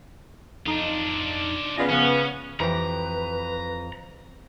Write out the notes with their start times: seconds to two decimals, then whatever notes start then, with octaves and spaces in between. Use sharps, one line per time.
0.66 F2 D4 D#4 F4
1.77 C#3 B3 F4 D5 D#5
1.90 C#3 F3 B3 C#4
2.60 F2 E3 G4 B4 A#5